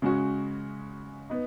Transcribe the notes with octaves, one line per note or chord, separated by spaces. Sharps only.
C#3 G#3 C#4 F#4
B3 D#4